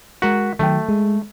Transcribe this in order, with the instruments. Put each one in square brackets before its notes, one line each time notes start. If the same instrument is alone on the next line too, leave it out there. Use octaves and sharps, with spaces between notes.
[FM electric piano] G#3 A#4 B6 [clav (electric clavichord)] F#4
[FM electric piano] D#3 F#3 G5 [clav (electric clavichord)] A3
[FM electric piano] G#3